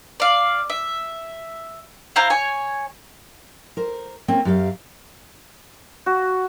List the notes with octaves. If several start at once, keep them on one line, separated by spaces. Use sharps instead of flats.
D5 F5
E5
E4 C5 F5 A#5
C#5 G#5
A#4 C5
A#3 C4 C#4
F#2 G4 F5
F#4